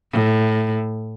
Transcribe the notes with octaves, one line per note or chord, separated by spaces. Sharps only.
A2